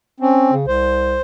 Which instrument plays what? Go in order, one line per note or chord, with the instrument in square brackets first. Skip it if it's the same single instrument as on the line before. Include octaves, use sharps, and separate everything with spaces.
[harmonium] C4 [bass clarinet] C#4
[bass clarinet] C#3
[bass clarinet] C2 [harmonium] C5